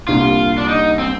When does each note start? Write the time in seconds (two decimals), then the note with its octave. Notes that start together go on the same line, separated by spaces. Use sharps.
0.07 C2 A#2 G3 D4 F4
0.58 D4
0.68 D#4
0.99 C4